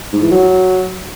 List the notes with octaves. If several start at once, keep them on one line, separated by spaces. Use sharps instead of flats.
G#2
E3
F#3